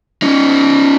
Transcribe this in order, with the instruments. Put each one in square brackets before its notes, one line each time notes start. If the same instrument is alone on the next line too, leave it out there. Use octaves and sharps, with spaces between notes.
[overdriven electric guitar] C#4 D#4